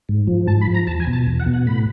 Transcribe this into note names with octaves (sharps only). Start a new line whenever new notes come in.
G#2
F3
G#2 A5
B5
F3
A#5
E2 A5
G#5
B2
A5
E2
F#5
B2
F#5
A2 B5